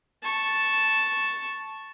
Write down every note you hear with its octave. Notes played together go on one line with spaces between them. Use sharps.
A5 C#6